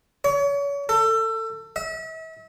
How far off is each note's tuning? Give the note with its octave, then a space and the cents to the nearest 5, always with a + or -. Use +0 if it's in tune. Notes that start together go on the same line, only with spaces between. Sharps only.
C#5 +35
A4 +25
E5 -40